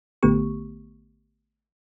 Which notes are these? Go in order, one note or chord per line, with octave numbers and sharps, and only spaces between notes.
A1 D3 A3 B3 G4 C#6